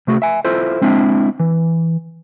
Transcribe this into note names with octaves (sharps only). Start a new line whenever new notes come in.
C3 A3 F#4 G#4
E5 G#5
E4 F4 A4 C5
G#3 C4 D4 E4
E3